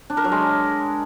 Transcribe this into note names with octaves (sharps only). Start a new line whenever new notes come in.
D4
A#4
F#3
G#3